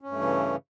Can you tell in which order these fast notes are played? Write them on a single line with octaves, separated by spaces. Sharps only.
C#4 G2 A3 E3 C#3